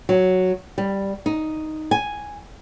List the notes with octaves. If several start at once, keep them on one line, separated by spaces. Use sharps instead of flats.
F#3
G3
D#4
G#5